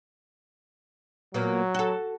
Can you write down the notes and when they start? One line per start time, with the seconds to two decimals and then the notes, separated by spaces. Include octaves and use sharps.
1.34 A#2 F#3 A#3 B3
1.75 F#4 A4